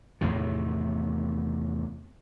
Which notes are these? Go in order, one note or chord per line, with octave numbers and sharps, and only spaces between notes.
E2 A2 C3 D#3